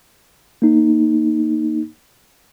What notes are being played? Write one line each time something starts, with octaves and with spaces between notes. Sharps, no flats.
A#3 D#4